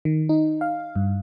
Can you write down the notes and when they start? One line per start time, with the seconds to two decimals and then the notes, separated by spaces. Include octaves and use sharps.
0.05 D#3
0.29 D#4
0.61 F5
0.96 G2